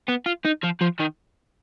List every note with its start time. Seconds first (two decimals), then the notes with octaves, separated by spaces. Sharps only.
0.08 B3
0.26 F4
0.45 D#4
0.64 F3
0.81 F3
1.00 D#3